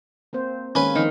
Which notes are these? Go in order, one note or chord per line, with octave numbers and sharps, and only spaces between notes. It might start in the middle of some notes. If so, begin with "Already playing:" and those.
A#3 C4 C5
D#3 G#3 A#3 C#4 B4
D#3 F3 C4